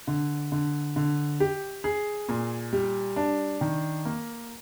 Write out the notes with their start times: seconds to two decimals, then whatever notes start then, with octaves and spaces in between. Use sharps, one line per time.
0.07 D3
0.52 D3
0.96 D3
1.40 G4
1.84 G#4
2.29 A#2
2.73 G3
3.16 D4
3.61 D#3
4.05 A#3